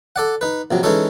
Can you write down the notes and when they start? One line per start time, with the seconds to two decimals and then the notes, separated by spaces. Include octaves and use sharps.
0.16 A4 D5 F#5
0.41 D#4 B4
0.71 A#1 C3 F#3
0.83 E3 G#3 C#4 D#4 A4 C#5